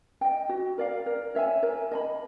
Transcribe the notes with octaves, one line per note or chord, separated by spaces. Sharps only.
D#5 G5
F#4
A#4 D5 F5
A#4
C#5 E5 G#5
A#4
D#5 G#5 B5